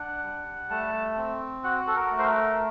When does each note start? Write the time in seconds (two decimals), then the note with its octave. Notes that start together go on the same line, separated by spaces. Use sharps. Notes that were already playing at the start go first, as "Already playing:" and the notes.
Already playing: D4 F#5
0.23 G3
0.70 A3 A5
1.17 C4
1.64 F#4 F#5
1.87 A4
1.96 A#4
2.11 A3
2.19 C5
2.27 A#4